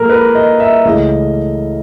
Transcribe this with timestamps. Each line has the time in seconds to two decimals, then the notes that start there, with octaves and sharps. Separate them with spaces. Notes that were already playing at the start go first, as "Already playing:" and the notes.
Already playing: A#2 F3 G#3 A4 A#4
0.10 B4
0.35 D#5
0.60 E5
0.85 C#2 C#3 E3 A3 D#5